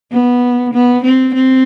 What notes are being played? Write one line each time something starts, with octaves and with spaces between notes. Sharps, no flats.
B3
B3
C4
C4